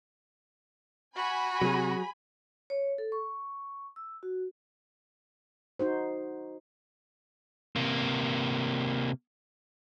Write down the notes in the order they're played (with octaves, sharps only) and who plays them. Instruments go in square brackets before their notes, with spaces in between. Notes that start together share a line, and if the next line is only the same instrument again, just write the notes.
[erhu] F#4 [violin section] G#5 B5
[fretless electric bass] C3 [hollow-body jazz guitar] F#3 G#4
[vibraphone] C#5
A4
C#6
E6
F#4
[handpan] D#4 F#4 C5
[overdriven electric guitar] C3 A#3